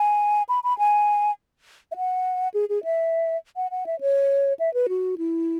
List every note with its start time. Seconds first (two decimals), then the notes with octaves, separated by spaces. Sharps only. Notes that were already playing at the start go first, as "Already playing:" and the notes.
Already playing: G#5
0.49 B5
0.64 B5
0.78 G#5
1.92 E5
1.96 F#5
2.54 G#4
2.69 G#4
2.84 E5
3.56 F#5
3.71 F#5
3.86 E5
4.01 C#5
4.59 E5
4.74 B4
4.89 F#4
5.18 E4